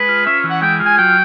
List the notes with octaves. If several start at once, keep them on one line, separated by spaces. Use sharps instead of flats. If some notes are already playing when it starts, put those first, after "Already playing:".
Already playing: G#3 B4
F4
C#4 E5
E3
F#5
G#3 G5
F4
G#5
F#3 G5